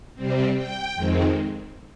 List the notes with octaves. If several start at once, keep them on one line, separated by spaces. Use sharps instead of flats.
C3 G3 C4
G5
F2 D#3 G#3 C4